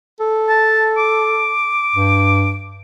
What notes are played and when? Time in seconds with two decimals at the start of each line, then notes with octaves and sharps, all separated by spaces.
0.20 A4
0.49 A5
0.98 D6
1.96 G2